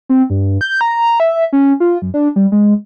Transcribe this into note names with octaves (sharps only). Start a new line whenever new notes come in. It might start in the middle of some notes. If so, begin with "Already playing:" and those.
C4
G2
G6
A#5
E5
C#4
F4
F#2
D4
G3
G#3